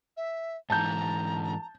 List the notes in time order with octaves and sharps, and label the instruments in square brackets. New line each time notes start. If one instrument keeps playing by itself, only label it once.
[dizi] E5
[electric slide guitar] G#2 E3 [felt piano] A5 G6 [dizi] A#5